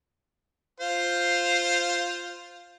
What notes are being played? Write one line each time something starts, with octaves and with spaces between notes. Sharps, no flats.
F4 C5